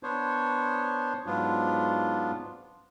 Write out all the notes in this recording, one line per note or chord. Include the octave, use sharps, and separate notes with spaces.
B3 D4 C5 C#5
G#2 F#3 B3 D4 F4